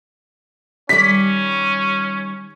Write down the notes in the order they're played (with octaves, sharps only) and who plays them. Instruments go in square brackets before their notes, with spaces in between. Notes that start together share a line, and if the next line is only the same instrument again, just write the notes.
[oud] D#3 G3 D5 [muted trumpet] C#4 [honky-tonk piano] B6